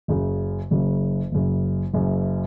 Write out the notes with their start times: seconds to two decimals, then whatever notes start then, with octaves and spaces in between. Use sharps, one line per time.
0.08 F#1 F#2 C#3
0.71 F#1 F#2 C#3
1.32 F#1 F#2 C#3
1.94 F#1 F#2 C#3